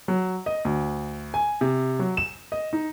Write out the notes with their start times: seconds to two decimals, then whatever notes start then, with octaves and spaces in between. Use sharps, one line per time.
0.08 F#3
0.46 D#5
0.65 D2
1.34 G#5
1.61 C3
1.99 F#3
2.17 E7
2.52 D#5
2.73 D#4